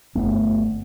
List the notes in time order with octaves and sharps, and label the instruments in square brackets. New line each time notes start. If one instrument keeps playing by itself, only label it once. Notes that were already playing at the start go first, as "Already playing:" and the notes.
[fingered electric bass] G1 D#2 A3 B3